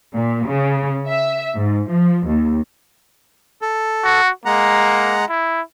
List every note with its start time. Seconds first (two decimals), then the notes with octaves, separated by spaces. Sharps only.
0.14 A#2
0.47 C#3
1.08 E5
1.55 G#2
1.89 F3
2.27 D#2
3.62 A4
4.04 F#4
4.45 G#3 A#3 F#5 A#5
5.30 E4